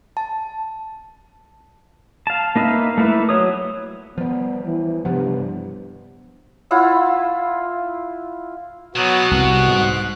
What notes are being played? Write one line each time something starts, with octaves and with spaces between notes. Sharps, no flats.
A5
F5 A5
A#3 D#4 B4 E5 F5
A3 A#3 E4 B4 E5
F#3 G#4 C#5 D#6
F3 G3 B3
E3
G2 C3 F3 B3
E4 F4 F#5 E6
B2 F#3 B3 F#4 F#6
C2 F#6
G#2